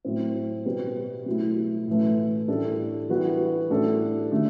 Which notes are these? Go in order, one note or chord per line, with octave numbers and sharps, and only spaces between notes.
A2 F#3 C4
B2 G3 B3
B2 F#3 A3 E4
A2 E3 A3
A2 G3 D4 A4
E3 G3 B3 F#4
A2 G3 D4 A4
D3 F#3 A3 D4